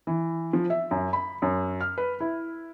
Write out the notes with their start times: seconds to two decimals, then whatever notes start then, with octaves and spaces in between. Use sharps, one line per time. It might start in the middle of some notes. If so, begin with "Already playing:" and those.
0.07 E3
0.53 F3
0.70 E5
0.91 F#2
1.13 B5
1.42 F#2
1.81 F6
1.98 B4
2.20 E4